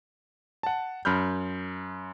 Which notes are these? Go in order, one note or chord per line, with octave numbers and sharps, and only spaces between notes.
F#5 A5
F#2 B5 F6 G6